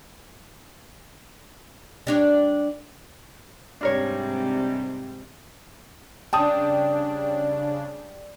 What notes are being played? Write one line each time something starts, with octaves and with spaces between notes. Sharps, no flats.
G3 D4 C#5
G#2 C3 G3 D4 A#4 C#5
C#3 G3 D4 G5 A5 D#6